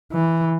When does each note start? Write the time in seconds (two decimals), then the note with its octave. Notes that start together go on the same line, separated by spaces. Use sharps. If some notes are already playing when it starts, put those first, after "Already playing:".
0.13 E3